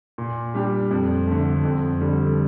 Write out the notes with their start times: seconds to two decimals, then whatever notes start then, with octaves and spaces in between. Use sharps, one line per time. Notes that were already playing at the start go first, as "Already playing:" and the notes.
0.18 A#2
0.54 G3 D4 G4
0.91 F2
1.27 D3 A3
1.65 F2
2.01 D3 G3